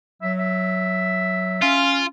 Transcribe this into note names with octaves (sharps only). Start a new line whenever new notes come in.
F#3 E5
E5
C#4 F4